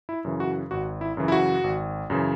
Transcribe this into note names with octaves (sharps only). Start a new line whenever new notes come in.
E4
F#2 C#3 E3
F#4
G#1 F#4
E4
F#2 C#3 E3
E4
F#4
G#1
F#2 C#3 E3